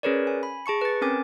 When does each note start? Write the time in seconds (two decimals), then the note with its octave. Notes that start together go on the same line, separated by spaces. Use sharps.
0.03 C#4 G#4 A#4 B4 C#5 D5
0.27 G#5
0.43 B5
0.66 G#4 A5 C#6 C#7
0.81 B4 A6
1.01 C4 C#4 A#4 G#5 D6 A6